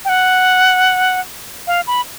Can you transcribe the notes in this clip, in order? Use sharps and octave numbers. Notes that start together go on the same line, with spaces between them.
G5
F#5
F5
B5